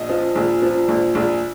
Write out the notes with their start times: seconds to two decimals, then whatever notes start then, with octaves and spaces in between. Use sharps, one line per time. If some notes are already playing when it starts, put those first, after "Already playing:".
Already playing: A#1 D#5
0.09 F3
0.35 A#1
0.62 F3
0.89 A#1
1.15 A#1